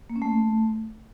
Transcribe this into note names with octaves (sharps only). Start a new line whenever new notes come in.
A#3
C#4
A3